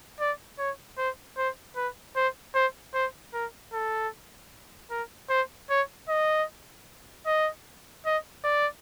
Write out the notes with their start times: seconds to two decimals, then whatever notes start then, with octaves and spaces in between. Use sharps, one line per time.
0.20 D5
0.59 C#5
0.98 C5
1.37 C5
1.76 B4
2.16 C5
2.55 C5
2.94 C5
3.34 A#4
3.73 A4
4.91 A#4
5.30 C5
5.70 C#5
6.09 D#5
7.26 D#5
8.06 D#5
8.44 D5